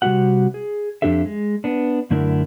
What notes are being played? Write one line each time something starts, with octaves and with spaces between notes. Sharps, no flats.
C3 G3 B3 F#4 G4 F#5
G#4
F2 E3 D4 G4 A4 E5
G#3
B3 D4
F#2 D3 A3 D4 E4 A#4